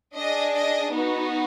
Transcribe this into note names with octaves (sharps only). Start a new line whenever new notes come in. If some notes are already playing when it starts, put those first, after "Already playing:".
D4 G#4 D#5
D#5
B3 D#4 F#4